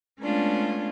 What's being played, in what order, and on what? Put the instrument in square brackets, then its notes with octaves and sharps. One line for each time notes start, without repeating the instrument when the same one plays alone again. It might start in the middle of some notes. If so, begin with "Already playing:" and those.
[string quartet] G#3 A3 B3 C#4 D4 F4